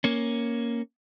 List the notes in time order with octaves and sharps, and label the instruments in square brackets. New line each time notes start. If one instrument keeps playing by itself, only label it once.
[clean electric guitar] A#3 C#4